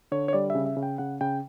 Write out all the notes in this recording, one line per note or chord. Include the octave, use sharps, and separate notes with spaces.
D3 C#5
C#5
G3 D5
C#3 E5
E5
C#3
G5
C#3 F#5
C#3 G5